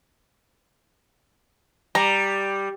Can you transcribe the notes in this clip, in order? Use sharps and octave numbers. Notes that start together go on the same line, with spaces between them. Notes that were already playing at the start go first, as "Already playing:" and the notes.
G3 A#5